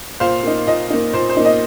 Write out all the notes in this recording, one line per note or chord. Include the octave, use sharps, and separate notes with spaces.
A#2 C5 F5
A#3 D#4
A#2 D#5
A#3 D#4
A#2 C5
C5
A#3 D#4
D#5